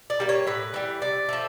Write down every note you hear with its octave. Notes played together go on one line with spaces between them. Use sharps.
D5
G3 A#3
C#5
A2 B4
E3 G3
C3 D5
F3 A3